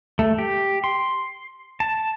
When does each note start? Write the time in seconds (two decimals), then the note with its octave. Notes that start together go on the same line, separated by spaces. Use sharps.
0.19 A3
0.38 G4
0.84 C6
1.80 A5